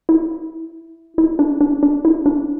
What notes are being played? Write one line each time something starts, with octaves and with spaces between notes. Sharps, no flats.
E4
E4
D4
D4
D4
E4
D4